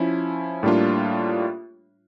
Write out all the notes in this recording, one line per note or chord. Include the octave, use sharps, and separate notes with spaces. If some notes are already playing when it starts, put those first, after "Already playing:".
Already playing: F3 C#4 E4
A2 G3 A#3 D4 F4